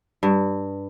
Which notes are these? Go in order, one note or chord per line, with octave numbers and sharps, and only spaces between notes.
G2